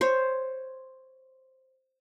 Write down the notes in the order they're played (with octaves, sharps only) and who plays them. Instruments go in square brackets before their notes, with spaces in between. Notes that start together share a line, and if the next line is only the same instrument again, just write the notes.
[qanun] C5 C#5